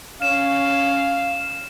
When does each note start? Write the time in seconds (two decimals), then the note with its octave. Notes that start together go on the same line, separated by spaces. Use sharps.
0.22 C#4 F5 E7